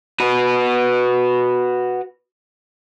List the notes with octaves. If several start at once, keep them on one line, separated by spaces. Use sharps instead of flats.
F#4 B4